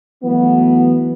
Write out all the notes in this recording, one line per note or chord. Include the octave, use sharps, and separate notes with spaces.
E3 F#3 A3 B3